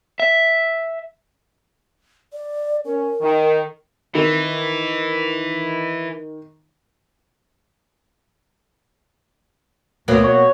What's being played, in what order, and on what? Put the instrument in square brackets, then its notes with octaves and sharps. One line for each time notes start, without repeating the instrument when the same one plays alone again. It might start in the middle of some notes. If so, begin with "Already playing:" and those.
[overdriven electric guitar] E5
[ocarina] D5
[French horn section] C#4 [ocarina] A#4
[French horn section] D#3
[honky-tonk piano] D#3 [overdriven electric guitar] E3
[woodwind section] D2 [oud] B2 F#3 A#3
[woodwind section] C#5